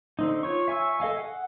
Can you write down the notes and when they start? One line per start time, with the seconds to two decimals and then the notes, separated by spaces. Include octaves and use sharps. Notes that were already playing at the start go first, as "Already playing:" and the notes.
0.19 D3 C4 D#4
0.43 F4 C#5 C#6
0.68 E5 G#5 C#6 E6
1.00 A4 D#5 F5 G#5
1.18 F#5